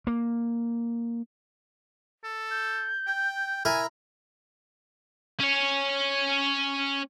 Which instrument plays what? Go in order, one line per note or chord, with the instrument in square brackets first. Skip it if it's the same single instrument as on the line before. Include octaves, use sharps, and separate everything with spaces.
[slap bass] A#3
[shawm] A4
[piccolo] G6
[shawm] G5
[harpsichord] E4 A#4 [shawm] G#5
[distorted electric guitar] C#4 C#5